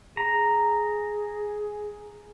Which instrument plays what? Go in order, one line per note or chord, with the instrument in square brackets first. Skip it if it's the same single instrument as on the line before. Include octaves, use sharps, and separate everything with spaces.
[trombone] G#4 [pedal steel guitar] A#5